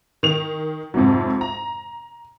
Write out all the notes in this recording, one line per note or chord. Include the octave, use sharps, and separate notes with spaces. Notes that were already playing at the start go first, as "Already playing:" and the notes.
D#3 F7
F2 G#2 C3 F#3
A#5